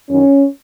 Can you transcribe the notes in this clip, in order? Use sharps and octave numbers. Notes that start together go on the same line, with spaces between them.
F#2 D#3 C#4